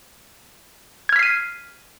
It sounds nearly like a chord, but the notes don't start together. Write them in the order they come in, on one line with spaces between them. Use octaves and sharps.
G#6 F6 B6 C7 D#7